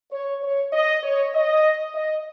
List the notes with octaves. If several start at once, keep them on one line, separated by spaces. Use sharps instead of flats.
C#5
C#5
D#5
C#5
D#5
D#5